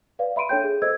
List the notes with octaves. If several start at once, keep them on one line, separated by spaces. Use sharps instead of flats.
B4 D5 F5
E5 B5 C6 D7 D#7
D4 A4 C#5 G5 G6
G#4
A4 C5 D#5 E6 G#6